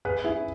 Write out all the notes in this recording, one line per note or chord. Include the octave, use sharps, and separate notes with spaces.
G#4 B4
E4 G#4